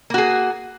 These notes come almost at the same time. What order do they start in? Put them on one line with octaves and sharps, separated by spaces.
A#3 F#4 G#4